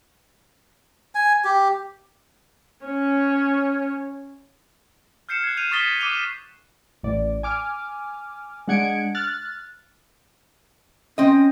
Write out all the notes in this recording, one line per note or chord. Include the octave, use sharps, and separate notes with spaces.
G#5
G4
C#4 C#5
F6 G6 C7 C#7 E7
F#6 G#6
G6 D#7 F7
C#6 D#6 A6 B6 G7
D6 D#6 D#7 F7 G7
A1 D5
G#5 D6 F6
G#3 D4 F#5 G#6 C#7 D7
F6 F#6 A6
C4 C#4 D#5